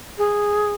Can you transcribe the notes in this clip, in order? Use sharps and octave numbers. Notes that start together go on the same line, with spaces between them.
G#4